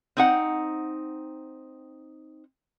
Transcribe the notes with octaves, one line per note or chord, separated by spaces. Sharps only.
C4 D#4 F#5